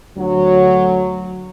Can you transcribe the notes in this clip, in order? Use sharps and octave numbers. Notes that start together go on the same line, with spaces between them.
D2 F#3